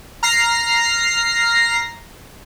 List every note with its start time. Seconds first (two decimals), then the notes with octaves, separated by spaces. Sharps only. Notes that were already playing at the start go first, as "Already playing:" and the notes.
0.23 A#5 F6 A#6 C7